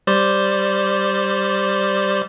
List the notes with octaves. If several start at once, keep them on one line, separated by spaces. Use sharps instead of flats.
G3 C5 D5